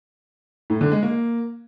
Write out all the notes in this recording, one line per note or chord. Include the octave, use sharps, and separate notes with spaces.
A2
D3
G#3
A#3